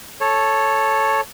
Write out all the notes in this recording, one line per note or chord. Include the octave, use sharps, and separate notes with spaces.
A4 C#5